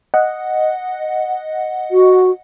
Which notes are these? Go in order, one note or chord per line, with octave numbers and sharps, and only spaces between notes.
D#5 F#5
F#4